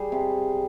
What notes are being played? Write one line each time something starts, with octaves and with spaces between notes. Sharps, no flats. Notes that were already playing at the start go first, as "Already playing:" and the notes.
Already playing: G3 G#4
C3